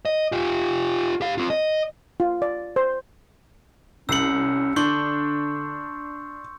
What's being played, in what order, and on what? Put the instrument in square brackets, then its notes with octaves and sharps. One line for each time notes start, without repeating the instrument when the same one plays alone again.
[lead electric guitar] D#5
F4 G4
G4 F5
C4 F4
D#5
[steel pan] F4
D5
C5
[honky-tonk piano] C2 C7 F#7 [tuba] C#4 [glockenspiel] E6 C#7
[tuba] D3 [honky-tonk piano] D4 [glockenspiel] C6 C#6 G6